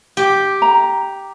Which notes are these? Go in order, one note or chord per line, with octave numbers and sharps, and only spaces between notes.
G4
A#5